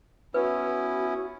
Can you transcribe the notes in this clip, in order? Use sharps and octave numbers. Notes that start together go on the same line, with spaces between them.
B3 C#4 E4 F#4 B4